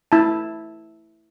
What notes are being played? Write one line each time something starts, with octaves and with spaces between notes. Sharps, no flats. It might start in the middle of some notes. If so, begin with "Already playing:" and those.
E4 A5